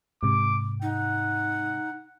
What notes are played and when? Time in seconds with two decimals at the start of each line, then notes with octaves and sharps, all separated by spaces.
0.23 G#2 C3 D6
0.82 D#4 F#5